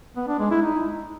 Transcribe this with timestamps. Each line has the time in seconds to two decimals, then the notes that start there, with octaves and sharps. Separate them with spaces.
0.16 B3
0.28 D4
0.39 G#3
0.51 E4
0.62 D#4